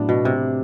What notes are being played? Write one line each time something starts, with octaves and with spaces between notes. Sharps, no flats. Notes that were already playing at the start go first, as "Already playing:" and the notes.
Already playing: A2 F#3 B3 D4
B2
C3